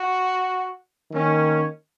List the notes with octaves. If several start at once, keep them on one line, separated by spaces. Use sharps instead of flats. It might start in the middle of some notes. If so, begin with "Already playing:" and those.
Already playing: F#4
D#3 A#3 C#4